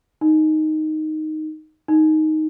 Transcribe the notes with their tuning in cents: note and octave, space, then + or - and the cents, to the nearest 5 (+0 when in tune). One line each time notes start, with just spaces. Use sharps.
D#4 +0
D#4 +5